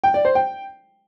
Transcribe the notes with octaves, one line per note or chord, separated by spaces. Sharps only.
G5
D5
C5
G5